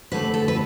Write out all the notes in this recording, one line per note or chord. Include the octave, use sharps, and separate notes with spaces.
D3 A3 C4 B4
A4
B4